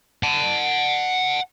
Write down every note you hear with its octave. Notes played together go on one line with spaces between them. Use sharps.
F#5 A5